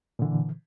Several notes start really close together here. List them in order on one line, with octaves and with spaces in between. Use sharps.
A#2 D3 E3